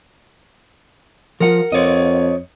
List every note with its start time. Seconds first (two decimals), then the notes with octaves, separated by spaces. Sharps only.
1.40 F3 F4 A#4 F#5
1.72 F2 C#5 D#5